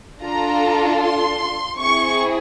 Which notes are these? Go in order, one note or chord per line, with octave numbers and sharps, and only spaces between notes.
D4 F4 A4 A#5
C6
C4 E4 G#4 C#6